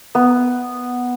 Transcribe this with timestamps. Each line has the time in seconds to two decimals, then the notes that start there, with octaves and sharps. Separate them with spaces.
0.15 B3